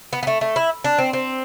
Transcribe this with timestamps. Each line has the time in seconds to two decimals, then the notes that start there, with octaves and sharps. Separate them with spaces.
0.13 B3
0.23 B3
0.27 A3
0.41 A3
0.56 E4
0.84 D4
0.99 C4
1.13 C4